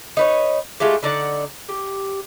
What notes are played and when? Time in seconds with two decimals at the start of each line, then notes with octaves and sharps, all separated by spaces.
0.17 D#4 B4 C#5
0.80 G#3 A3 F4 G4
1.03 D3 D#4 D5 F#5
1.69 G4